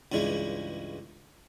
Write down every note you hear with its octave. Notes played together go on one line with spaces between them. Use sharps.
C#2 G2 E3 G#3